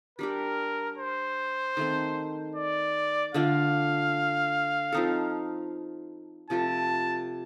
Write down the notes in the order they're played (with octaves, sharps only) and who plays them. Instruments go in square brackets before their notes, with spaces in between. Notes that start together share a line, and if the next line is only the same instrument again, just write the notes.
[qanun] G3 D4 G4 [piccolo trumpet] A#4
[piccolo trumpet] C5
[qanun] D#3 A3 C4
[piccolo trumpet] D5
[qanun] D3 A3 D4 F4 [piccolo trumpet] F5
[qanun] F3 C4 D#4 A4
[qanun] C3 F3 A3 [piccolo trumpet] A5